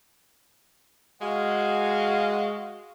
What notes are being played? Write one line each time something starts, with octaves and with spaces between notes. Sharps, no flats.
G#3 F#4 F5